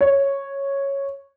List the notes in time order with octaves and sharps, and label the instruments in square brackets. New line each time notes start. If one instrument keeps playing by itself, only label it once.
[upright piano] C#5